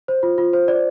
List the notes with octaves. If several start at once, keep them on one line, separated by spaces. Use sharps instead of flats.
C5
F4
F4
C5
D5